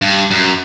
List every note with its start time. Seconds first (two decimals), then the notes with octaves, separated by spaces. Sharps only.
0.02 G2
0.31 F#2